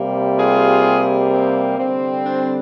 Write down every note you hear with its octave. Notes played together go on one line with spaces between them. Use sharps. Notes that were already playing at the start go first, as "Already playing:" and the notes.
Already playing: C3 G3 A#3
F4 G#4
C4
D3 G3 C4
D4